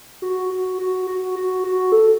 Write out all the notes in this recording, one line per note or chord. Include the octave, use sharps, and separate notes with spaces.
F#4
F#4
F#4
F#4
F#4
F#4
A4